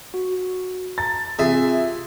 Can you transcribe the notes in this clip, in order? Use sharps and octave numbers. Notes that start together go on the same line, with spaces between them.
F#4
A5 A#5 A6
C3 F4 G#4 E5